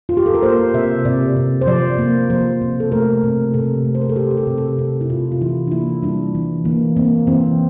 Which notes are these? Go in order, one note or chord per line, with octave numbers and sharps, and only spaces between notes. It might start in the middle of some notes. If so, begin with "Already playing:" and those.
F4
G4
A4
A#4
A#3 C5
C3 E5
C3 D5
C3
C5
F3 D5
A#3
F3 C5
C3
A4
A3 A#4
C3
C3 A4
A3
C5
A#4
A4
C3 G4
G4
A4
C3
A4
C3 A4
E4
C3 F4
F4
E3 E4
D4
A#3 E4
G3 D4
E3
E3 A#3
A#3 C4
E3 C4